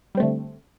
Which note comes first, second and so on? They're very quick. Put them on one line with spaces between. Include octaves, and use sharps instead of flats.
G3 C4 A3 D3